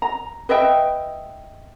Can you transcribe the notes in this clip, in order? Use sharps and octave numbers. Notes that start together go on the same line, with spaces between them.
A#5
B4 D#5 E5 G5